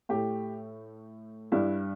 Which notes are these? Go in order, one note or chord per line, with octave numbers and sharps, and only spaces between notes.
A2 A3 G4
G2 G3 E4